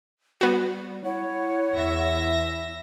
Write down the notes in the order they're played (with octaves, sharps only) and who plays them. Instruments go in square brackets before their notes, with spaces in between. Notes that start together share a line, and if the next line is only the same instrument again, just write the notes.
[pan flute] G3 [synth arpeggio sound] B3 F#4
[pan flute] E4 [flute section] C#5 F#5
[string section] E2 E5 A#6